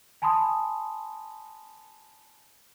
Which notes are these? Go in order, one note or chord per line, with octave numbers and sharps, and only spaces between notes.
G#5 A5 B5 C6 D#6